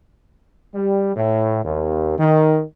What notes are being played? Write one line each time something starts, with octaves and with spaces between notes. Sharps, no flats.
G3
A2
D#2
D#3